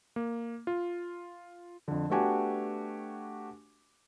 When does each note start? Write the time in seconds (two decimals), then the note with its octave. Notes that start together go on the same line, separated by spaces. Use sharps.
0.16 A#3
0.67 F4
1.88 F2 D3
2.10 A3 B3 D4 F#4 G4 G#5